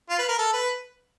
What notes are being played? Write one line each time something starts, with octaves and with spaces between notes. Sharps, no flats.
F4
B4
A#4
A4
B4